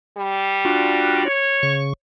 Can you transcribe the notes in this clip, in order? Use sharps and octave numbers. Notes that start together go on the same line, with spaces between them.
G3
D4 F4 F#4
C#5
C#3 C#6